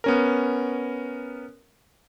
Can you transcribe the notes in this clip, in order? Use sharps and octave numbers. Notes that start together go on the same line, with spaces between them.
B3 C#4 A#4